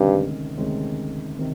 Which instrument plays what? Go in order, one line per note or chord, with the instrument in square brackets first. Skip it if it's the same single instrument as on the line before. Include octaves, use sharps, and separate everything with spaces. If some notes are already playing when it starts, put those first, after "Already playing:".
Already playing: [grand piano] D2 C3 D#3 G#3 C#4 [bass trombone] G2
[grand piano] D2 C3 D#3 G#3 C#4
C3 D#3